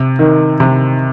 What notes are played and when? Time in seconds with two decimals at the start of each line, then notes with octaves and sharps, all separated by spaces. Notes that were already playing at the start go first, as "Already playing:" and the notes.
Already playing: C3
0.19 D#3
0.60 C3